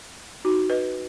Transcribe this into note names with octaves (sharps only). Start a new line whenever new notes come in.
D#4 F#4
B4 D#5